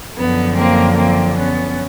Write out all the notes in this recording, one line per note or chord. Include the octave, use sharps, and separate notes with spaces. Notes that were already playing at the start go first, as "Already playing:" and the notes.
F#2 D3 F3 B3
A#3 C4
A#3 C4
B3 C#4